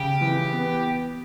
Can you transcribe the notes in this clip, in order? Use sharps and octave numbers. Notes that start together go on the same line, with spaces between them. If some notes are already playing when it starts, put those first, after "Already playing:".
Already playing: C#3 G4
E3
B3